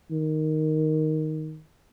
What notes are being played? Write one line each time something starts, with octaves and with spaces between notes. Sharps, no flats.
D#3